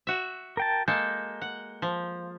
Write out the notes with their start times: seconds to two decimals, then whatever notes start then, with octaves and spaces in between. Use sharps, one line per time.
0.07 F#4 E5
0.57 A#4 G5 A5
0.88 G#3 A#3 A4 G6
1.41 F#5
1.82 F3